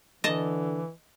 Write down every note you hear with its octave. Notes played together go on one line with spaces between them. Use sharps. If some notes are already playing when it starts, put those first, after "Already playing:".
D3 E3 D#5 A5